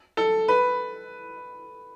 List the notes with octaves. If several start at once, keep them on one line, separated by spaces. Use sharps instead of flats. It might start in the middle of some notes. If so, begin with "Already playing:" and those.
A4
B4